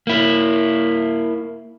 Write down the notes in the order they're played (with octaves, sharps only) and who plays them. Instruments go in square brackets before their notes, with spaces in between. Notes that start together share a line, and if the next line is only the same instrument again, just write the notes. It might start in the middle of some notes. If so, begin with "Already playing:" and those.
[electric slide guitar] A#3 E4